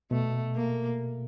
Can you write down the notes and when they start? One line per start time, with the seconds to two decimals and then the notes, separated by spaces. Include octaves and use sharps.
0.11 B2 A3
0.56 A#3